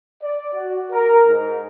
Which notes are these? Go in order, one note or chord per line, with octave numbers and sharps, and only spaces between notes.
D5
F#4
A#4
G#2